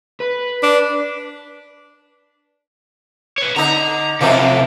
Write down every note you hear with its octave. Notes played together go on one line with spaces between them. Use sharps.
B4
D4
B4 C#5
D3 D#4 A#5
F2 C3 E3 A3 F4